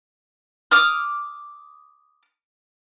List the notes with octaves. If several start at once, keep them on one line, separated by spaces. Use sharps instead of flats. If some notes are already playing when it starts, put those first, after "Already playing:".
D6 D#6 F6